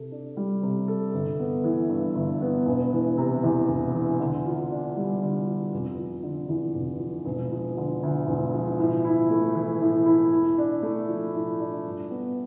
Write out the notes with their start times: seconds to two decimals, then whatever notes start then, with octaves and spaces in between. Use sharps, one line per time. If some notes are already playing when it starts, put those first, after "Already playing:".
Already playing: C3 A4
0.11 D4
0.37 G3
0.62 C3
0.88 A4
1.13 G1
1.40 B3
1.64 E3
1.89 G2
2.15 G1
2.41 B3
2.66 E1
2.93 E3
3.18 C3
3.44 E2
3.68 E1
3.94 E3
4.20 D3
4.45 F4
4.71 D4
4.96 G3
5.22 D3
5.47 F4
5.73 F1
5.99 F3
6.23 D3
6.49 E2
6.74 F1
7.00 F3
7.25 E1
7.52 F3
7.77 D3
8.03 D2
8.27 E1
8.54 F3
8.79 A2
9.05 E4
9.30 A3
9.55 E3
9.81 A2
10.06 E4
10.32 A2
10.58 D4
10.82 A3
11.08 F3
11.34 A2
11.59 D4
11.85 G2
12.11 B3